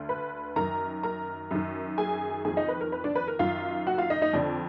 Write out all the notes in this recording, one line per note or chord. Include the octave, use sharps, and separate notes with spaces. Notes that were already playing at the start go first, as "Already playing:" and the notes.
Already playing: D2 D3
B4 B5
F#2 D#3 A#4 A#5
A#4 A#5
F#2 D#3
G#4 G#5
F2 D#3 G#4 G#5
D#4 D#5
B4
A#4
B4
D4 D5
B4
A#4
F#2 D#3 F4 F5
F#4 F#5
F4 F5
D#4 D#5
D#4 D#5
F2 D3 D4 D5